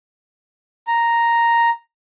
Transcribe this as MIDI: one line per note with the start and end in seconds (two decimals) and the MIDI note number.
0.87 1.70 82